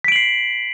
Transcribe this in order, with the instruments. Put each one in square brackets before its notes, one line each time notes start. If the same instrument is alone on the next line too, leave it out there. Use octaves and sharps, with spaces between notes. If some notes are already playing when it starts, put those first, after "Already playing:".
[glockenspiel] B6
D7
F#7
C7